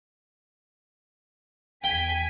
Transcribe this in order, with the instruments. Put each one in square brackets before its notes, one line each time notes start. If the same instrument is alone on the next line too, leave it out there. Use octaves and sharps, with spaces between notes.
[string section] E2 G#5 B6 [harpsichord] G5